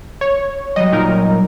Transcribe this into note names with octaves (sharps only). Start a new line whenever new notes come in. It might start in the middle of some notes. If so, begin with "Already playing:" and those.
C#5
F#3 G3 D#5
A#2 D#4 A#4